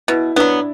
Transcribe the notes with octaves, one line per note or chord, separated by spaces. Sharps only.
B2 E4
F#3 B3 D4